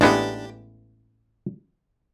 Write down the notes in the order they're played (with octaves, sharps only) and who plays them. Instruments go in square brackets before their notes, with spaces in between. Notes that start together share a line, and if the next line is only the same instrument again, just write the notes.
[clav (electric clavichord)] A1 G#3 B3 [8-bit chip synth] D4 G4